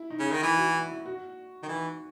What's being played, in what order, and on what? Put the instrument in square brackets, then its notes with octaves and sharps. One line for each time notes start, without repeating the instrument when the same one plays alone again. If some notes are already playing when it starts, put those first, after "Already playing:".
Already playing: [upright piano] E4
D#4
[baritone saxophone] C#3
D#3
[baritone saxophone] E3 [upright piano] E4
[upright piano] F#4
E4
E4
F#4
[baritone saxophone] D#3
[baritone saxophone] E3 [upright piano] D#4